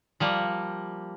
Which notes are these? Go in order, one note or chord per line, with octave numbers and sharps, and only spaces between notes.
F3 G3 A#3